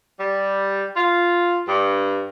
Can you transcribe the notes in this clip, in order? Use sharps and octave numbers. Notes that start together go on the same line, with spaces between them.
G3
F4
G2